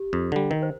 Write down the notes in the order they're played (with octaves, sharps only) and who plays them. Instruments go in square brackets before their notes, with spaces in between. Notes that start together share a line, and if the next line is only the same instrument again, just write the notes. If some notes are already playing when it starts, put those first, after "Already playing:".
Already playing: [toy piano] G4
[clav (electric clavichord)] F2
D3 G3
[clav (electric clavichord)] D#3 [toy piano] A#4
[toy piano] C5